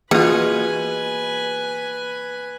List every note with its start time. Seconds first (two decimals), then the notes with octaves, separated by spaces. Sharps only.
0.11 B2 E3 A#3 F4 G#4 B4 G#5